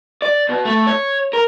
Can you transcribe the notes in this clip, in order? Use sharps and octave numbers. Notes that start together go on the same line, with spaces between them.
D5
B2
A3
C#5
A#4